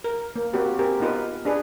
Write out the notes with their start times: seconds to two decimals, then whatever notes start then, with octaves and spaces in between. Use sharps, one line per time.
0.04 A#4
0.36 A#3
0.53 A#3 C4 F#4 G4 B4
0.79 C4 G4 A#4 G#5
1.00 B3 D#4 F4 A#4 B4
1.45 D4 G#4 B4